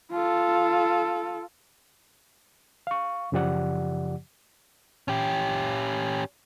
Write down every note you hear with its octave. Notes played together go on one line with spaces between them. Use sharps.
F4 A4
F5 C#6
F#2 C#3 F3 G4 D5 F#5
C#4 G4